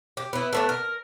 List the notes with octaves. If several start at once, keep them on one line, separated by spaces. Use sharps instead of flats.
G4
B3 E4
A3 B3 D4
A#4